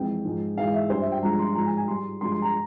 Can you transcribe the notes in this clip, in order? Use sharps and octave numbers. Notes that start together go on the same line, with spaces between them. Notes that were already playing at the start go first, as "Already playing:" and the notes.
Already playing: F2 E3 G#3 G5
G#2 F3 G#3
G#2 E3 G#3 F5
E5
G2 G3 C5
E5
G5
G2 F3 G#3 A#5
C6
G#2 F3 G#3 A#5
G#5
G#5
G#2 G3 C6
G2 F3 G#3 C6
C6
A#5